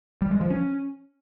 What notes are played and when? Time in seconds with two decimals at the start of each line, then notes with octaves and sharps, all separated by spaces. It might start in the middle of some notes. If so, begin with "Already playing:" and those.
0.22 G3
0.31 G#3
0.41 F3
0.50 C#4